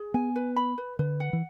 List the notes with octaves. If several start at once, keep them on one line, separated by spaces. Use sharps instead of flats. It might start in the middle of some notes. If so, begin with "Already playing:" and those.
Already playing: G#4
B3 G#5
B4
B5
B4
D3 B4
F#5
E3